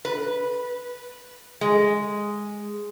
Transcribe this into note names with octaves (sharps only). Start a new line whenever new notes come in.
B4
G#3